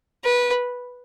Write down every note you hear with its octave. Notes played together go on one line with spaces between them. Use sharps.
B4